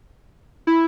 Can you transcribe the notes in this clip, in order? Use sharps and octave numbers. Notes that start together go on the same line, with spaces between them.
E4